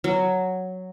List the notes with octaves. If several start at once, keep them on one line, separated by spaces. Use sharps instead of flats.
F#3